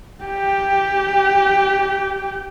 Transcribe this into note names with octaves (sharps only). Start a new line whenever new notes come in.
G4 G5